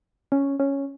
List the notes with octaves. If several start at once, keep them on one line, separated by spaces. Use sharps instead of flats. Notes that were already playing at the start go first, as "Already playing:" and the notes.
C#4
C#4